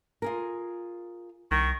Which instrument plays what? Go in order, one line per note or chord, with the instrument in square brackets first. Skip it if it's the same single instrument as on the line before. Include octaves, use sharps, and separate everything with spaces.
[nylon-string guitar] F4 G#4 A#4
[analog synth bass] C2 [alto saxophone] D#3 [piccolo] C#6